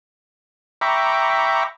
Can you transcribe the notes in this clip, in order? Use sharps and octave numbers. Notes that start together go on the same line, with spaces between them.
E5 G5 A#5 B5 C#6 D6